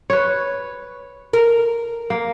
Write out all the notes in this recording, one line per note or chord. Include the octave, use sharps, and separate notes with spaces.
B4 C#5
A#4
A#3